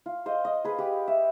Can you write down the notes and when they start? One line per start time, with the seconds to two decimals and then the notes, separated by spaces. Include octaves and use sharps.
0.06 F4
0.26 C5 D#5 F5
0.45 D#5
0.64 G#4 B4
0.78 G4 B4
1.08 E5